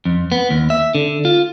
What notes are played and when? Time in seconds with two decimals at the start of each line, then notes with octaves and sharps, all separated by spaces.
0.05 F2
0.32 B3
0.50 D#2
0.70 E5
0.95 D3
1.25 F4